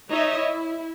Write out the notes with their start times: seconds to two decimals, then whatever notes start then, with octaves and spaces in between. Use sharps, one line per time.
0.10 D#4 C#5 D#5 E5
0.40 E4